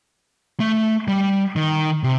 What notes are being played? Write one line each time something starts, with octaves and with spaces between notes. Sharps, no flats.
A3
G3
D#3
C3